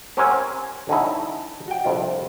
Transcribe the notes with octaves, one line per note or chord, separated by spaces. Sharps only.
C4 C#4 G4 A#4 F#5 G#5
D3 G3 C#4 D#4 E4
F#4 G5
C2 F2 D4 F4